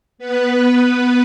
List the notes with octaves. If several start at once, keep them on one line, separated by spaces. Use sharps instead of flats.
B3 B4